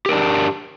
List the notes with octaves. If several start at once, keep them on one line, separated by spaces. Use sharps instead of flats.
D4 G4 A#4